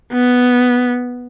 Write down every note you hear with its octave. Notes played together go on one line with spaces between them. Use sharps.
B3